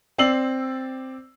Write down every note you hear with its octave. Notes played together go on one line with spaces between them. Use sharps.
C4 D5 E6 C7 F#7